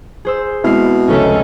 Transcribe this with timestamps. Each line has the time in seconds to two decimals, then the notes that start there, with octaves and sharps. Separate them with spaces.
0.25 G#4 C5 E6
0.64 B2 G#3 C4 E4 F6 C7
1.08 F1 C#2 C#4 A4 E5